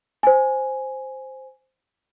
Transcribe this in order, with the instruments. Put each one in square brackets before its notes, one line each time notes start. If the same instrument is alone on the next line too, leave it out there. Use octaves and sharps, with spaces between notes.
[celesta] C5 G#5